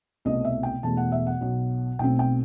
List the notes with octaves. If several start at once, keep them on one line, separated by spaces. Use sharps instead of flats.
C2 B2 A3 C4 D#5
E5
G5
E1 E2 B2 A3 A5
F#5
E5
F#5
B1 B2 F#3
B1 B2 A3 C4 G5
G5